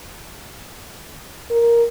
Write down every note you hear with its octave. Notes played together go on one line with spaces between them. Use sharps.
A#4